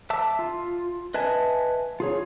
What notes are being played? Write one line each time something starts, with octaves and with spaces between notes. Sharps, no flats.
E5 A5 D6 E6
F4
B4 D#5 E5 G#5 A5
F4 G#4 C#5